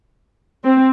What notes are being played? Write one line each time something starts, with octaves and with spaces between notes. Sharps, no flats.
C4